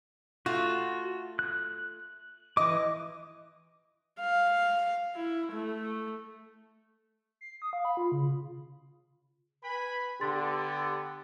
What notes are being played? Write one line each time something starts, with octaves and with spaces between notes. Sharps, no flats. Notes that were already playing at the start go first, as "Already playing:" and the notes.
A3 F4 F#4
F#6
E3 D#5 D6
F5
E4
A3
C7
D#6
F5
B5
F4
C#3
B4 G#5 B5
D3 B3 G4 C6 A6